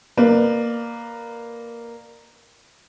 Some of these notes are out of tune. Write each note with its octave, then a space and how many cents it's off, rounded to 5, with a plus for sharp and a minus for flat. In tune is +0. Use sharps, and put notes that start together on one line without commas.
A#3 +0 B4 +5 D5 +30